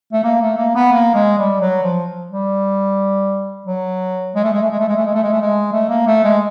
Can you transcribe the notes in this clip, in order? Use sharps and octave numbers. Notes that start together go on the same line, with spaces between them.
A3
A#3
A3
A#3
B3
A#3
G#3
G3
F#3
F3
G3
F#3
G#3
A3
G#3
A3
G#3
A3
G#3
A3
G#3
A3
G#3
A3
G#3
A3
A#3
A3
G#3